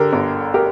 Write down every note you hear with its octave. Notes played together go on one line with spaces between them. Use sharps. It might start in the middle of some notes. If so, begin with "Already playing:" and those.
Already playing: D3 G4 A#4
G1
G4 A#4